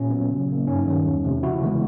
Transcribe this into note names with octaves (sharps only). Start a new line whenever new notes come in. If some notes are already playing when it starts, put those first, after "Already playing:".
Already playing: A#2 C#4
F#3 B3
C#3
F#3 A#3
G2 C#4 D#4
D#3 G3
E2
C3 F3 A3
C#3 E4 F#4
E3 G#3 B3